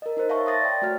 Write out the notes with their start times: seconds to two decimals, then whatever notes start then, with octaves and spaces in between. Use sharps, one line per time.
0.02 A#4 D#5
0.17 D#4 A#4 C5
0.29 C#5 E5 F5 A5 C#6
0.46 C6 D#6 A6 A#6
0.62 D5 G5
0.82 A3 F#4 C#5 F6